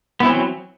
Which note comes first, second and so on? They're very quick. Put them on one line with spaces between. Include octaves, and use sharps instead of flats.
B3 E4 C4 E3 F#3